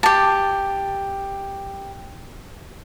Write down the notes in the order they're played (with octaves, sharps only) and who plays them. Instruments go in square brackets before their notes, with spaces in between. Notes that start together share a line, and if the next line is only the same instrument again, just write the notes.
[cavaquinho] G4 A5